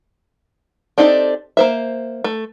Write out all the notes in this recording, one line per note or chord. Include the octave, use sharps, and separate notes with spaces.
C4 D4 D#4 G4 A4
A#3 C5 E5
A3